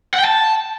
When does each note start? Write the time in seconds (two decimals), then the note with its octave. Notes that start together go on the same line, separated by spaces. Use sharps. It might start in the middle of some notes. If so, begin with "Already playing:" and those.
0.14 F#5
0.19 G5
0.25 A5